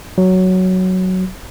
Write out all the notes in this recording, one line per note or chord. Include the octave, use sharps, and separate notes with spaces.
F#3